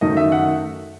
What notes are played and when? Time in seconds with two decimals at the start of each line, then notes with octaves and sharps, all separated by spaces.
0.01 F#2 D#3 A3 D#4 D#5
0.17 E5
0.32 F#5